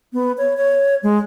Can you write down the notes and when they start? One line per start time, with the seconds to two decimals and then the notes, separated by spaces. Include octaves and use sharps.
0.13 B3
0.38 C#5
0.57 C#5
1.03 G#3